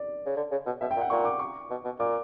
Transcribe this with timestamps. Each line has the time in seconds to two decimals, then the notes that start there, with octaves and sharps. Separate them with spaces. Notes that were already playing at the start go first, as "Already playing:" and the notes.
Already playing: D5
0.26 C#3
0.37 D3
0.51 C#3
0.66 B2
0.81 B2 E5
0.91 G5
0.96 A#2
1.01 F#5
1.10 A#2 C#6
1.25 D6
1.39 C#6
1.70 B2
1.84 B2
1.99 A#2 D6